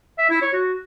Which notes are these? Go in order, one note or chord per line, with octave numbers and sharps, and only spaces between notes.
E5
E4
C#5
F#4